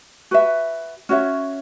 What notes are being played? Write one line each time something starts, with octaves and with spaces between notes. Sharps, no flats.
F#4 B4 E5
C#4 F#4 C#5 E5